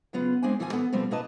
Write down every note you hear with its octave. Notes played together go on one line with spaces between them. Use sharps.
C#3 F#3 B3 F4
G#3 C4 D4 G#5
D2 E3 F3 E4 F4 G#5
E3 B3 A4
B2 F3 G3 A3 C4
B2 A#3 E4 B4 D#5 A5